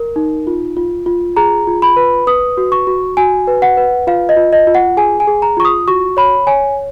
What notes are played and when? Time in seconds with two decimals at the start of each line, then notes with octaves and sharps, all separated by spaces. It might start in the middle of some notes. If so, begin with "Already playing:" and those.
Already playing: A#4
0.16 D#4
0.47 F4
0.77 F4
1.06 F4
1.36 G#4 A#5
1.67 F4
1.82 B5
1.96 B4
2.27 B4 D#6
2.57 F#4
2.72 C#6
2.87 F#4
3.17 F#4 G#5
3.47 B4
3.62 F#5
3.77 B4
4.07 F4 F5
4.29 D#5
4.36 F4
4.53 D#5
4.67 F4
4.75 F#5
4.97 G#4 G#5
5.20 G#5
5.27 G#4
5.42 A#5
5.57 F4 C#6
5.65 D#6
5.88 F#4 C#6
6.17 C#5 B5
6.47 C#5 G#5